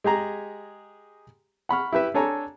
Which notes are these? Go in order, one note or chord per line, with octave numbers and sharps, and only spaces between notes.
G#3 G4 G#4 A#5
F#5 B5 C#6 F6
E4 G4 B4 E5
D4 A4 C#5 G#5 A#5